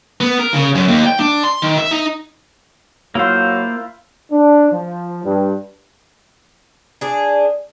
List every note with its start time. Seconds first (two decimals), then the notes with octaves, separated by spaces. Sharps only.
0.21 B3
0.39 A#4
0.54 C#3
0.75 F#2
0.88 D#2
1.06 G5
1.20 D4
1.43 C6
1.62 D#3
1.78 E5
1.91 D#4
3.15 F#3 A#3 E4 F4 C5
4.32 D4
4.72 F3
5.25 G2
7.01 D4 G#4